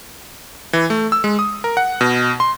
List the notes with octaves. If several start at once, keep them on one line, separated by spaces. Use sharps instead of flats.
E3
A3
E6
G#3
D#6
A#4
F#5
B2
C6